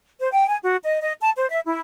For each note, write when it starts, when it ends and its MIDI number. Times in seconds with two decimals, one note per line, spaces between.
0.20 0.30 72
0.32 0.46 79
0.48 0.57 80
0.63 0.76 66
0.83 1.00 75
1.01 1.13 75
1.22 1.31 81
1.36 1.46 72
1.51 1.60 76
1.65 1.81 64